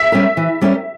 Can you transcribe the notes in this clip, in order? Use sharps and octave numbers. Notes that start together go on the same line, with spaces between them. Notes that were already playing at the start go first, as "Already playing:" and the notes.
Already playing: E5
G3 C#4 G4 A#4
E3
G3 C#4 G4 A#4